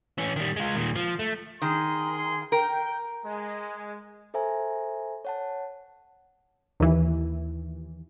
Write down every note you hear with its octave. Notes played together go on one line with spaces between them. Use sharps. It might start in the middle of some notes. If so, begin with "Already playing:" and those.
E3 C#4
D#3 G3
G#3 F4
A#2 D#3
F3
A3
D#3 G#4 C6
A#4 G5
G#3
A4 C5 E5 G#5 A#5
C#5 F#5 A5
D#2 E3